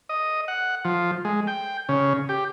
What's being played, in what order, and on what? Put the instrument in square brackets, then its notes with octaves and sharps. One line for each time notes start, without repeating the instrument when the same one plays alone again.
[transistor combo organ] D#5
F#5
F3
G#3
G5
C#3
G4